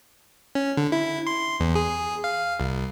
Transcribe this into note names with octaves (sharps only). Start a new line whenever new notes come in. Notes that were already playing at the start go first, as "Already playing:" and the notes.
C#4
D3
E4
C6
E2
G#4
F5
C2